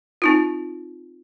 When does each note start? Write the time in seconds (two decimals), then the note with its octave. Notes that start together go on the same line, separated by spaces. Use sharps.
0.22 C4 D#4 F4